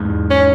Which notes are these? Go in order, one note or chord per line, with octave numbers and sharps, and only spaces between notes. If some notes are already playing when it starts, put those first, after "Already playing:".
Already playing: E2 G#2
C#4